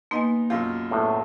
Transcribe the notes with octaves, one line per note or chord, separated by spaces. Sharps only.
A#3 B3 D#4 D#5 G#5 C6
B1 F#2 F4 G4
E2 A2